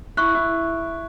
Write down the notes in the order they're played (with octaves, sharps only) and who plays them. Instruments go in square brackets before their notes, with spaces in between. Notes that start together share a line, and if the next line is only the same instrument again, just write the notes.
[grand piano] E4 [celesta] C#6 F#6
[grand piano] E4